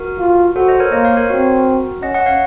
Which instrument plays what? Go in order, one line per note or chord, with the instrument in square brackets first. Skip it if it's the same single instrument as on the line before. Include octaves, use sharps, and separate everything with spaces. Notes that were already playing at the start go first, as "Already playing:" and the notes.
Already playing: [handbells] F#4 A#4
[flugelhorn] F4
[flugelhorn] F#4 [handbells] A4 C5
[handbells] C5 D#5
A#4 C#5
[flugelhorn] A#3 [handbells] C5 D#5
[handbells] C#5 F5
A#4 C#5
[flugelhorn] C4 [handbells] F#4 A#4
[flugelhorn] C#4 [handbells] D#5 F#5
[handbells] D#5 F#5
C#5 F5